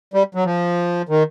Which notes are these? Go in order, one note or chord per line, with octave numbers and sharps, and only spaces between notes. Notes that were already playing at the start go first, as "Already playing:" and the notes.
G3
F#3
F3
D#3